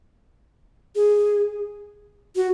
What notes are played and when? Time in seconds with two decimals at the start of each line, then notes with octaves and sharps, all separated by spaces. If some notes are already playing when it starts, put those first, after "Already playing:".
0.96 G#4
2.36 F#4